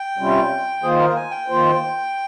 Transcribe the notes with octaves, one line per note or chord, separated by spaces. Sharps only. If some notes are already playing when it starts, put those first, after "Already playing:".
Already playing: G5
C3 G3 C#4 F4
D#3 A#3 F4 G#4 C5
A#4
G#5
G5
D#3 A#3 F4 C5